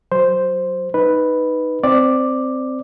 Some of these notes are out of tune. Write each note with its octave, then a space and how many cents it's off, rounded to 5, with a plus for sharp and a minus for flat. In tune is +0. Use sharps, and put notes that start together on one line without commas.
F#3 +0 C5 +0
D#4 +0 B4 +0
C4 -5 D5 +5